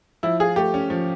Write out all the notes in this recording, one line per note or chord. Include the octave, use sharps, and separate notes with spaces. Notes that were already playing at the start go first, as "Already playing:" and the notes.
F3 E4
F4 G#4
A3 G4
C#4
F3